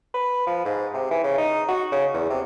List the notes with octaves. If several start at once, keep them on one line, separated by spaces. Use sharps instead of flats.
B4
F3
G#2
C3
E3
C#3
D#4
F#4
C#3
E2
C3